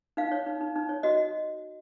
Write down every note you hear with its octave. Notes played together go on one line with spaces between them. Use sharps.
D#4 F5
C#5
D#4
D#4
D#4
C#5
F#4 D#5